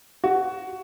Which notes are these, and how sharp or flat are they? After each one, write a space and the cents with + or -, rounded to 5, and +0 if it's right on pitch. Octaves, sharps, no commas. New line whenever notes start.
F#4 +10